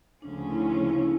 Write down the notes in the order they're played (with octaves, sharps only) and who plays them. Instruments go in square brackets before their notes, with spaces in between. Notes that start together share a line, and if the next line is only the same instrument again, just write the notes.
[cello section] D2 C#3 F3 A#3 C#4 [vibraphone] D4
[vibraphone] E4
D#4
E4